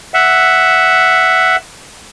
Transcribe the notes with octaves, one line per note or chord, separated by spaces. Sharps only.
E5 F#5